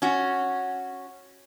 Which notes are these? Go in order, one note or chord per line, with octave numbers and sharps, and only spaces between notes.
C#4 F#4